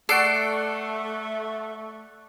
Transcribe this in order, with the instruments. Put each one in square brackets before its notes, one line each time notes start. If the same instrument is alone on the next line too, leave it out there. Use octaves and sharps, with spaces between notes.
[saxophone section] A3 [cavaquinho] A4 [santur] D5 F#5 C#6 [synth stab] C7 D7